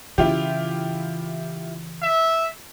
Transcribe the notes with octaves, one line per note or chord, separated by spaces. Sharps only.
C#3 E3 E4 F4 G4
E5